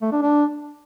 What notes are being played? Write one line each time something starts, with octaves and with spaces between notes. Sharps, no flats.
A3
D4
D4